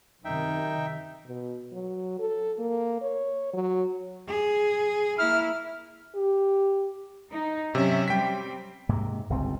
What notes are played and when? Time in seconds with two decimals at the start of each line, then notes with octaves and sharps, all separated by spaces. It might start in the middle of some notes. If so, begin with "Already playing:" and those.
0.25 F#2 C3 D#3 D#4 E5 G5
1.27 B2
1.73 F#3
2.19 A4
2.59 A#3
3.02 C#5
3.53 F#3
4.28 G#4
5.18 A#3 E4 F6
6.16 G4
7.32 D#4
7.75 C3 F#3 C#4 E5
8.08 G3 C4 G5 B6
8.89 G#2 C3 A#3
9.30 G1 C#2 C4